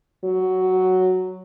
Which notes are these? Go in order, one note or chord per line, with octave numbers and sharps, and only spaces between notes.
F#3